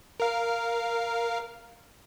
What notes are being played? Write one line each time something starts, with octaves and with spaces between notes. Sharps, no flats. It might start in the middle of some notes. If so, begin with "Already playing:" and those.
A#4 F5